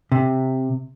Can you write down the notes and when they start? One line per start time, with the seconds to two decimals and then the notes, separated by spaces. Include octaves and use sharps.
0.12 C3